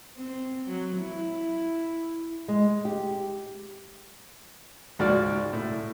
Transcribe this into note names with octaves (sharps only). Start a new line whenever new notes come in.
C4
F#3
E4
G#3
G4
C#2 G#2 F#4 D5 F6
A2